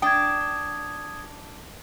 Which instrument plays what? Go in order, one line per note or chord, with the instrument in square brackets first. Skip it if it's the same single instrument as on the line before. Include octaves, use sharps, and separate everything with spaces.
[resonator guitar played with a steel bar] D4 G5 [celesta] D#6 G#6